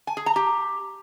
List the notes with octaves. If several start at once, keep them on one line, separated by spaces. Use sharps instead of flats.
G#5
G#4
A#5
G4